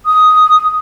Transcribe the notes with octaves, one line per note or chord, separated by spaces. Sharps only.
D#6